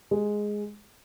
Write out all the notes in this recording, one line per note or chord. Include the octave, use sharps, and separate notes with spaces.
G#3